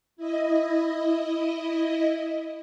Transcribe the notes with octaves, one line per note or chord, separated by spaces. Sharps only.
E4 D#5